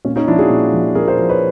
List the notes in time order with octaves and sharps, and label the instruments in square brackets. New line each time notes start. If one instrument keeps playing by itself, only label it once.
[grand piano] A#2 C#4
C#4 D#4
F3 D4 E4
F#4 G#4
A#2
F3
A#2 G#4 A#4
A#4 C5
F3
B4 C#5